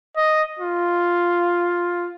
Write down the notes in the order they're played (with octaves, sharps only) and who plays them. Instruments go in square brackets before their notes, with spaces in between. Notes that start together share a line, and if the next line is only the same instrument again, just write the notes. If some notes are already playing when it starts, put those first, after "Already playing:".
[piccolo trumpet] D#5
F4